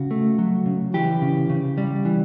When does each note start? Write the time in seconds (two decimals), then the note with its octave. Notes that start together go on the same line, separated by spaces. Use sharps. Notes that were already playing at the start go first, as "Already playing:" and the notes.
Already playing: C#3 F#4
0.11 A3
0.39 F#3
0.66 C#3
0.94 E3 G4
1.22 C#3
1.50 C#3
1.78 G3
2.05 E3